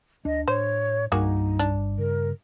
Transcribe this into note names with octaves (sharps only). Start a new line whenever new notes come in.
D2 D4 D#5
A2 C5 C#5
C2 G2 A#3 D#4 F#4 G#4
D4
G1
C#3 A#4